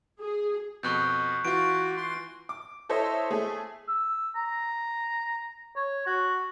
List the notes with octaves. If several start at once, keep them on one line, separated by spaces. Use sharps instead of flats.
G#4
F2 B2 C#6 F#6 G6
E3 F4 F#4 D7
C6
D6
E4 A4 C5 C#5 D#5 E5
A3 G#4
E6
A#5
C#5
F#4